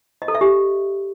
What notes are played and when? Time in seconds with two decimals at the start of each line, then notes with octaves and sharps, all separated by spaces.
0.22 D#5
0.28 A4
0.35 E5
0.41 G4